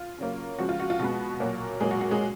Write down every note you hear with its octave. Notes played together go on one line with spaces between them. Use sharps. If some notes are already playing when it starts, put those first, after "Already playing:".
Already playing: F4
C#3 F#3 A#3
C#3 F3 G#3 F#4
F4
F#4
F4
B2 G#3 B3 F#4
A#2 F#3 A#3
A#2 F#3 G#3 A#3 G#4
F#4
F#4
G#3 G#4